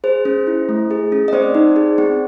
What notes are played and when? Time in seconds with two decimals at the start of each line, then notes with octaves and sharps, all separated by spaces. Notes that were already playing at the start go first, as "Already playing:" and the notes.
0.04 G#4 C5
0.25 C#4
0.47 E4
0.69 A3
0.91 G#4
1.12 C#4
1.28 D#5
1.33 C4 C5 D5
1.55 D#4
1.76 G#4
1.98 C4